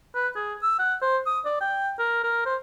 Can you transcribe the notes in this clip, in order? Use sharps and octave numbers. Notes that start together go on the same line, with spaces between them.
B4
G#4
E6
F#5
C5
D#6
D5
G5
A#4
A#4
C5